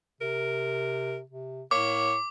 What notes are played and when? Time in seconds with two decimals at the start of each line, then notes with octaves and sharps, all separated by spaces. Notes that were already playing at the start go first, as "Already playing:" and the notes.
0.21 C3 A#4
1.30 C3
1.71 A2 A#3 C#5 D6